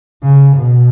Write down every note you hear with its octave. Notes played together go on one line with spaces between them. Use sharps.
C#3
B2